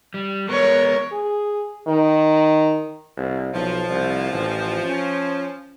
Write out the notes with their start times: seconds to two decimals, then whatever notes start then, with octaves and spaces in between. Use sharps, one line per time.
0.14 G3
0.49 G#3 B3 A#4 C#5
1.12 G#4
1.88 D#3
3.17 C2
3.54 B1 F3
3.89 C2
4.33 A1
4.84 C#4